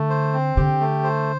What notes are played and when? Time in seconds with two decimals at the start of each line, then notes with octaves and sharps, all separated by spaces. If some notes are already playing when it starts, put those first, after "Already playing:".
Already playing: D3 A3
0.10 C5
0.33 C4
0.57 D3 G4
0.80 A3
1.04 C5